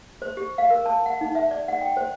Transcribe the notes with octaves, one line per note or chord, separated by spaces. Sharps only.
C5
G4
F5
A#4
A5
F#5
D#4
E5
D5
F#5
G5
C5